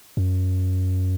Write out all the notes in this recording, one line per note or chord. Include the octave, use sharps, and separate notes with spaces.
F#2